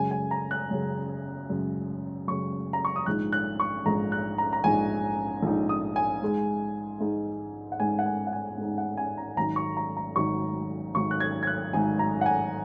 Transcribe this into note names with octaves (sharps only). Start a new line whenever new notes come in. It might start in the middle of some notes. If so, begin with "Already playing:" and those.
Already playing: F#2 C#3 G#3 G#5
G#5
A#5
F#6
F#2 C#3 G#3
F#2 C#3 G#3
F#2 C#3 G#3 C#6
A#5
C#6
D#6
A#1 G#2 G#3 D#4 F#6
F#6
C#6
A#1 G#2 G#3 D#4 A#5
F#6
A#5
A#5
A#1 G#2 G#3 D#4 G#5
A#1 G#2 G#3 D#4
D#6
G#5
G#2 G#3 D#4
G#2 G#3 D#4
F#5
G#2 G#3 D#4 G#5
F#5
G#5
F#5
G#5
G#2 G#3 D#4
F#5
G#5
A#5
G#1 G#2 F#3 D#4 A#5
C#6
A#5
A#5
G#1 G#2 F#3 D#4 C#6
G#1 G#2 F#3 D#4 C#6
F#6
G#6
G#6
F#6
G#1 G#2 F#3 D#4 G#5
A#5
F#5
G#5